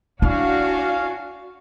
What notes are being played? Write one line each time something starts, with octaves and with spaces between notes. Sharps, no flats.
C#4 D4 E4 F#4 F5